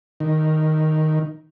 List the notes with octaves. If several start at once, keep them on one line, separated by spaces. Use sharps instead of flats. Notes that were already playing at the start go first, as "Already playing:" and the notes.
D#3